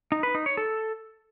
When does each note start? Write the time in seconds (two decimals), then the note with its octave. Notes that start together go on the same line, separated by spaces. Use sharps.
0.12 D#4
0.23 B4
0.35 D#4
0.46 C#5
0.57 A4